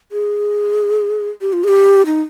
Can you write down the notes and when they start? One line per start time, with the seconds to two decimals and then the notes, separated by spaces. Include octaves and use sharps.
0.12 G#4
1.41 G4
1.53 F4
1.64 G#4
1.68 G4
2.06 D#4